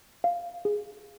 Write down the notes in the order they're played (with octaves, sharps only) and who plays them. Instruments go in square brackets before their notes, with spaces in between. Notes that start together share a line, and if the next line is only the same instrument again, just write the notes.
[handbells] F5
G#4